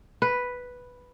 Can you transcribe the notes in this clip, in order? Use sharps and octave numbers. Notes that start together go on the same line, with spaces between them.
B4